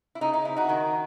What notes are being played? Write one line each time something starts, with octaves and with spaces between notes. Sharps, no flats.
E4
C#3 D#4
D#4
C4 E4
D#4 F#4
D#3